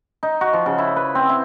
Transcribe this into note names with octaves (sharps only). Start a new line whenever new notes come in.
D#4
F#4
F3
C#3
E4
B4
C4
E4